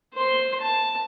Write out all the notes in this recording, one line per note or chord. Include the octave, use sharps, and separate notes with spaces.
C5 C6
A5